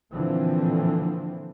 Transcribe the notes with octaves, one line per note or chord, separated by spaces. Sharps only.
A#2 D3 E3 F3 C4